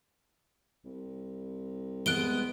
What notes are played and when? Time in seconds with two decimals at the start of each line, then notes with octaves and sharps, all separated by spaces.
0.84 C2
2.06 G#3 B3 F#6 D7 G7